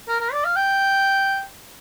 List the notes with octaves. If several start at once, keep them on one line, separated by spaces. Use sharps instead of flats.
A#4
A#4
D5
F5
G5